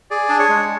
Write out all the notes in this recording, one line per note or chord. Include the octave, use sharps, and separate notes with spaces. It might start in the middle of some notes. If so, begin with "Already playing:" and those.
G#4 D5
D4
C#5
G#3